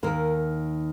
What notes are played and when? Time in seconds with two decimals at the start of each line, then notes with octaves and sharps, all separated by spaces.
0.03 D#2 D#3 A#4